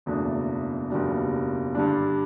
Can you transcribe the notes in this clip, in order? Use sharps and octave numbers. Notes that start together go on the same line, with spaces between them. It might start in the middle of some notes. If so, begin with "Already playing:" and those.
F#1 E2 B2 A3 D4
F#1 E2 B2 G3 D4
G2 D3 G3 D4